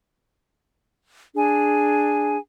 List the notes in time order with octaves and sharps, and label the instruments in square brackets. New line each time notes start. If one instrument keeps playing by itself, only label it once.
[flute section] D4 G#4 G#5